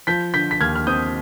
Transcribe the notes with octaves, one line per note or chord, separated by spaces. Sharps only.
F3 G6 B6
D3 G6 B6
B6
D#2 F6 G#6
F6
C4 D#6 G6